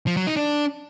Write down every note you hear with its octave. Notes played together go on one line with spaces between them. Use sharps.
F3
F#3
D#4
D4